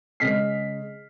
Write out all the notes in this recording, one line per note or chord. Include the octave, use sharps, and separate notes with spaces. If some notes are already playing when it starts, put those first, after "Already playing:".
C#3 G#3 D#5 F6 B6 C7